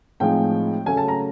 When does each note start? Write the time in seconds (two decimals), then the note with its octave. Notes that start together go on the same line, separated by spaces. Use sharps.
0.20 A2 F3 G#3 C4 D#4 G5
0.86 C#3 F#3 A3 G#5
0.97 A5
1.08 A#5